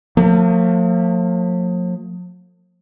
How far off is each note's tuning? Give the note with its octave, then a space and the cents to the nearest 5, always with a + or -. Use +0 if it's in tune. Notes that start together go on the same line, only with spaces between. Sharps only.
F3 +45 A#3 -45